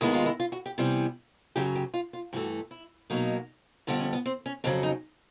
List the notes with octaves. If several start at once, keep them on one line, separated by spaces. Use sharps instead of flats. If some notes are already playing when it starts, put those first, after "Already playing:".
D#2 D#3 G#3 B3 E4
F4
E4
F4
F#4
G4
C3 E3 G3 B3
F#2 C#3 F#3 G4
G4
F4
F4
G2 E3 A3 F#4
E4
B2 F#3 A#3 D#4
F2 D3 G3 B3 D4
C#4
B3
C4
C#4
F2 C#3 F#3 D4
D#4